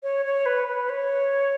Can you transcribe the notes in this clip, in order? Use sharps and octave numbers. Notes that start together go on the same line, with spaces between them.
C#5
C#5
B4
B4
C#5